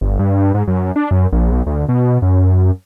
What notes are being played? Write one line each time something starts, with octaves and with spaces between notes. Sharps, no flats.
G1
G2
G#2
F#2
D4
F#2
A#1
B1
D2
B2
F#2